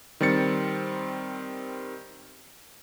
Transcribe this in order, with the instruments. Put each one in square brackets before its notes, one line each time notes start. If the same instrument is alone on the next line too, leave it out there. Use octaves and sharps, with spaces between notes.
[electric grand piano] D#3 G3 C4 A6 C#7